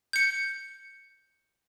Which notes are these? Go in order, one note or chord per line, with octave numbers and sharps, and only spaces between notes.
G6 C#7